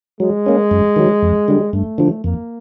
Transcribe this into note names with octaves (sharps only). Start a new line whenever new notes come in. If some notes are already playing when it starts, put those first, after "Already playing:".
F#3 G#3
A#3 C#4
F#2
D#3 F#3
F2
D3 G3
G2 A3
D3 F3
F2 A#3